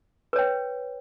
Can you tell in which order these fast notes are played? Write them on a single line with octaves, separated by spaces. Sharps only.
B4 C#5 G5